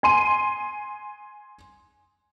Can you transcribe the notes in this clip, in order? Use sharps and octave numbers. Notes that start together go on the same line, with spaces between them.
G#5 C6 D#7